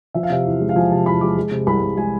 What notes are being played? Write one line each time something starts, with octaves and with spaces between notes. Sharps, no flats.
F3 E5
F5
C3 E5
E2
G#3
F5
F3 G#5
C3 A5
E2 B5
G#3 D6
G#3
C3
C2 B5
C2
G#3 G#5